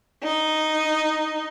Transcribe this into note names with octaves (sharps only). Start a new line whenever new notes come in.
D#4